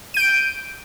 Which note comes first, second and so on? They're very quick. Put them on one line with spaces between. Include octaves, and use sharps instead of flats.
D#7 G6 D7